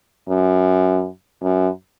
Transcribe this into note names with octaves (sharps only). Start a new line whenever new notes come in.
F#2
F#2